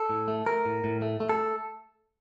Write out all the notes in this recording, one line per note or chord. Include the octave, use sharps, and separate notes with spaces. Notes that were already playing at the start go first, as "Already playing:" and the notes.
Already playing: A4
A2
A3
A3 A#4
A2
A2
A3
A3
A4